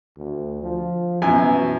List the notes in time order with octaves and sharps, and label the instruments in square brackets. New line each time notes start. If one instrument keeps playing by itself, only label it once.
[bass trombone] D2
F3
[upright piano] F#2 B2 [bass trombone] E3 [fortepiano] G#5